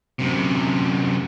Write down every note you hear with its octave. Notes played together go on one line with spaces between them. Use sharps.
F#2 C3